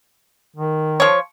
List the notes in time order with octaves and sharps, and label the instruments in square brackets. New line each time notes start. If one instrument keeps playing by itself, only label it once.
[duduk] D#3
[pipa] F3 C#5